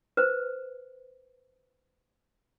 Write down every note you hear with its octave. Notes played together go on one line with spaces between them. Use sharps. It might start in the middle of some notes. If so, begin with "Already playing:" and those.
B4 C5